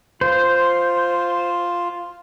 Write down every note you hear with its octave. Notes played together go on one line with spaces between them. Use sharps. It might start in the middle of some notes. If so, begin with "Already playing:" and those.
F4 C5